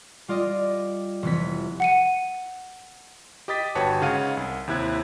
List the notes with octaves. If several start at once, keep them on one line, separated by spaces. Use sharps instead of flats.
G3 F4 D5 D#5
F1 E3 B3 B6
F#5 C#7 D#7
G4 D#5 D#6 A6 B6
G1 F#4 B4 C#5 G5 A5
G#2 C#3 C#5 F5 F#5 D#7
C2
D#2 C3 E4 F#6 G#6